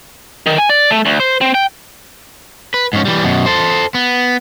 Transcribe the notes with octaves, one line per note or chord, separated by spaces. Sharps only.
D#3
G#5
D5
A3
D2
C5
C4
G5
B4
G#2 C#4
E3 G3
F#2 B2
A4 C5
B3